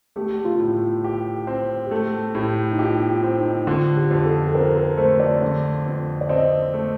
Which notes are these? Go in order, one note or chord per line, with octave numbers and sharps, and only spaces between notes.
A3 G4
F4
A2
G4
C4
G4
A3 A4
A2 G4
D#4
F4 G4
F4
C4
D#4
D3 F4
G4
F2
A4
A4
C4 A#4
A#4
A3 C5
D5
D3
F2
D5
C4 D#5
A3